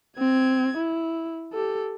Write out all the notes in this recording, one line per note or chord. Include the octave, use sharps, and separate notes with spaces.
C4 G#6
E4
G4 A4